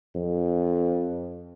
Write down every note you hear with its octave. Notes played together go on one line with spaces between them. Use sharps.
F2